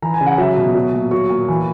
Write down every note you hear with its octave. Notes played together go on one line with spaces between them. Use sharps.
E3 A#5
G#5
C#3
F#5
F#3 E5
B2
F#3
A#2
F#3 C#6
A#2
E3